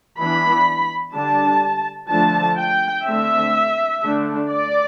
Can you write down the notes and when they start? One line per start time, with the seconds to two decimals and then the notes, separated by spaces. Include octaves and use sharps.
0.18 E3 B3 D4 B5
1.14 D3 G3 D4 A5
2.10 D3 F3 A3 D4 A5
2.58 G5
3.06 D3 A3 C4 E5
4.02 D3 A3 D4
4.50 D5